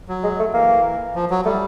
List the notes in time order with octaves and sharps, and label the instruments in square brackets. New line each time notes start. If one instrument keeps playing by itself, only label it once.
[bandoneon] F#3
[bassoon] G#3
A3
[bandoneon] E3 [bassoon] A#3
[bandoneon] F3
F#3
[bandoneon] G3 [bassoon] A3